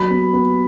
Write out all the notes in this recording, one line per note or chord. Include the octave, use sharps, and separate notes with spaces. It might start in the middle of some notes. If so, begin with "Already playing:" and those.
Already playing: F#3 B5
B3
B3